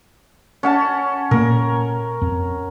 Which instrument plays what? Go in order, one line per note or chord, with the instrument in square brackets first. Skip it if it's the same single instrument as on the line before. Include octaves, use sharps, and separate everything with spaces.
[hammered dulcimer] C#4 F#5 A5
[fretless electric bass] A#2 A#3 [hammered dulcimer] A#4
[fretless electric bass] F2